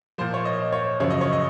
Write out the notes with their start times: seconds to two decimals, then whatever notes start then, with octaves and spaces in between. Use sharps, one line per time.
0.18 A#2 F3 C5
0.34 C#5
0.45 D#5
0.72 C#5
1.00 F#2 C#3 F3 C#5
1.10 D#5
1.21 C#5
1.33 D#5